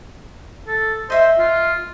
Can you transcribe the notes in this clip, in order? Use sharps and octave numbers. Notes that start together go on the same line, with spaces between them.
A4
C5 D#5 E5
F4